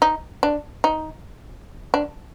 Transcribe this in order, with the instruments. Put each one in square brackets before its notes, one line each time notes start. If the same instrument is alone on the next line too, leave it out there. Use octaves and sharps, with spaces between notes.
[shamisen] D#4
D4
D#4
D4